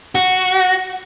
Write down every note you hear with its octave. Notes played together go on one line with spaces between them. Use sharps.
F#4